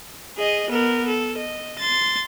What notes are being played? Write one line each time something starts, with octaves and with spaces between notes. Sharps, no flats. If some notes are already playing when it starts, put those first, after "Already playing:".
G#4 D#5
B3 A#4
A4
D#5
C6 A6